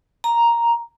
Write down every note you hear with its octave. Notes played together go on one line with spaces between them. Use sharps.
A#5